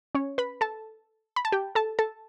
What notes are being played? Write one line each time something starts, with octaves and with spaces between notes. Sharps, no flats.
C#4 C#5
B4 B5
A4 A5
B5
A5
G4 G5
A4 A5
A4 A5